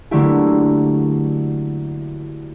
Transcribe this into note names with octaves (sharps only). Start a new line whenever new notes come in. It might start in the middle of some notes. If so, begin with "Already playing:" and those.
D3 F#3 A3 A#3 E4 G4